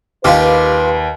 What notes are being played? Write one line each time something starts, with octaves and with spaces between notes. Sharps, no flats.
D#2 F4 G4 B4